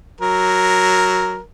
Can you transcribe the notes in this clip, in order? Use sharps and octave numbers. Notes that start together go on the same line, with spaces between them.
F#3 A#4